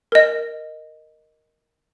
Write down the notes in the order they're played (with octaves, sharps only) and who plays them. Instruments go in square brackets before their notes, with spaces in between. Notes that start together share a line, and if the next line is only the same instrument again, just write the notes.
[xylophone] A#4 D#5